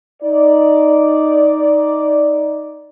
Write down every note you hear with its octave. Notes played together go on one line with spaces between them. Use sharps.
D#4 D5